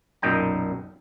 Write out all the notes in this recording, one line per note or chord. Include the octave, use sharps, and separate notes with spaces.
B1 F#2 A#2 D#4 G5 A#5